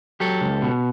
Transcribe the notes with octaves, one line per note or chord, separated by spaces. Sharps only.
F#3 G4 A4
C#2
B2